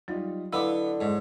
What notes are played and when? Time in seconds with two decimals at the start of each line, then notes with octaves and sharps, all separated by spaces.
0.08 F#3 G3 D#4 F4
0.53 D3 B3 E4 D#5 F5 B5 D6
1.01 G#2 C#5